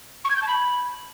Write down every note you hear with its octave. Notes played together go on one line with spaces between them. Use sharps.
C#6
G#6
G6
A5
B5